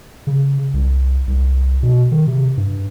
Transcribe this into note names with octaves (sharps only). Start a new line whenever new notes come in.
C#3
C2
C2
B2
D#3
C3
G2